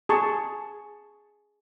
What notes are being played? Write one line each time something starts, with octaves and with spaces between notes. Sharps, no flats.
G#4 A5 C#6